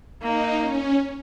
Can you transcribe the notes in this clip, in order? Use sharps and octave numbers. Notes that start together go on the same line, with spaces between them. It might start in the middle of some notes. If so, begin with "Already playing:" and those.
A#3 D#4
C#4